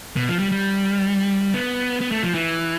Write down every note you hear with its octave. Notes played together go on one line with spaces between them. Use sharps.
B2
F3
G3
G3
B3
B3
A3
F3
E3